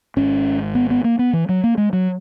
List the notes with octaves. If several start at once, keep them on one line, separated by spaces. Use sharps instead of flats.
G#1 G#2 C#4
B3
B3
A#3
B3
E3
F#3
A#3
G#3
F#3